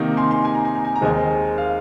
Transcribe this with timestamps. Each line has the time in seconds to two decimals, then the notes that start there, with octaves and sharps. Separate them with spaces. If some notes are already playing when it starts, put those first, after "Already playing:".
Already playing: C3 D#3 A#3 D#4
0.17 G#5 C6
0.31 G#5 C6
0.45 G#5
0.55 A#5
0.65 G#5
0.75 A#5
0.85 G#5
0.96 A#5
1.01 D#2 D#3 G#3 C4 D#5 G#5
1.58 F5